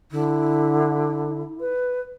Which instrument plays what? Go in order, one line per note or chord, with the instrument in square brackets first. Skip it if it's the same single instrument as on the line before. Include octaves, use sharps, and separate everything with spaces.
[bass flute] D3 [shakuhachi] E4
[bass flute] B4